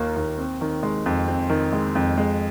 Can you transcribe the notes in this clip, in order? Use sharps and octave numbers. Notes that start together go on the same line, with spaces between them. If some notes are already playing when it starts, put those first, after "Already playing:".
Already playing: D#2 D#3 A#3 F4
D#2
C4
D#3
G#3
F2
C4
D#3
G#3
F2
G#3